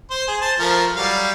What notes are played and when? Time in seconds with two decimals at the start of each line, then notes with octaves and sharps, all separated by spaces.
0.10 C5
0.28 G#4
0.41 C5 A5
0.59 F3 A3 A#4
0.96 F#3 G3 F5